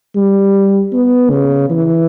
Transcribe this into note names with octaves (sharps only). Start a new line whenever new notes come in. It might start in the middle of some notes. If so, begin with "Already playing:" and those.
G3
B3
C#3
E3